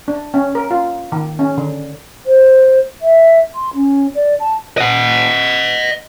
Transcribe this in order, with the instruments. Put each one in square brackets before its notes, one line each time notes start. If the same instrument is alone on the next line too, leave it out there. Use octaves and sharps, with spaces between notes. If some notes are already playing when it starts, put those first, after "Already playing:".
[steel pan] D4
C#4
A#4
F4
D#3
C#4
D3
[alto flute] C5
E5
C6
C#4
D5
A5
[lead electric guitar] D#5 F#5